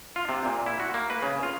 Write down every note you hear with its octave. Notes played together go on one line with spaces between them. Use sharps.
F4
C3
A#2
E4
F#4
A#3
B4
C#3
F4